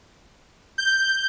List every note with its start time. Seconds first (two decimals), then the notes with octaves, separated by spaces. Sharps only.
0.78 G6